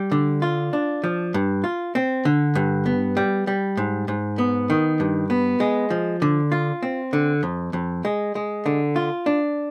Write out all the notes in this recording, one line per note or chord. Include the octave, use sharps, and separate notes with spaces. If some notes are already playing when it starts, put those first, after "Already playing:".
Already playing: G3
D3
F4
D4
F3
G2
F4
C4
D3
G2
B3
G3
G3
G#2
G#2
B3
D#3
G2
B3
G#3
F3
D3
F4
C4
D3
F2
F2
G#3
G#3
D3
F4
D4